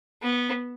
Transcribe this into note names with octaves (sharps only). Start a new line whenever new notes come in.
B3